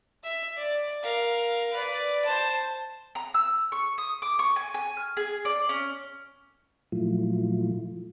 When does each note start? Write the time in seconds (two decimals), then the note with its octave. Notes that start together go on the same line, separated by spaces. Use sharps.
0.23 E5
0.57 D5
1.02 A#4 F5
1.73 B4 D5
2.25 C5 A5
3.15 A#5
3.34 E6
3.72 C#6
3.98 D#6
4.22 D6
4.39 C#6
4.56 G#5
4.74 G#5
4.97 F6
5.17 G#4
5.45 D5
5.69 C#4
6.92 A#2 F3 F#3 A3 E4 F4